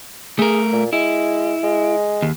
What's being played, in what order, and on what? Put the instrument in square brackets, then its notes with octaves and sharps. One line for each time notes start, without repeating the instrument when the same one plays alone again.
[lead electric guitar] A3 A#4 [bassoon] G#4
[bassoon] A#2
[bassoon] G#3 [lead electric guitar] E4
[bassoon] G#3
[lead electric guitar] D#2